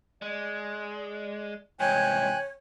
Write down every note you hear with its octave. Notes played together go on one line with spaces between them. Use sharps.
G#3 D5
C2 G#2 C3 E3 C#5 G5 G#5 F#6